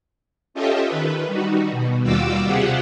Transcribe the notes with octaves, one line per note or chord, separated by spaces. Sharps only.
C#4 F4 G4 A4 D#5 E5
D#3 B4
G3 D#4 F#4
B2
D#2 G3 F4 F#4 D6 E6
C3 F4 G4 G#4 F#5